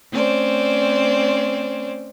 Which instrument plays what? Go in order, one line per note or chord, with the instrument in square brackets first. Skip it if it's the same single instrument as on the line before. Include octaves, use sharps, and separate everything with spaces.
[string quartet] A3 C4 C#4 C5 D5